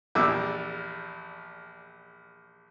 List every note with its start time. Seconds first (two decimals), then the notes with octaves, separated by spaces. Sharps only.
0.15 A#1 E2 G3 D6 E6